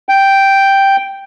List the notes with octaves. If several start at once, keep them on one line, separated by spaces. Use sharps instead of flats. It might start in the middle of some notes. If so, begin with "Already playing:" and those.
G5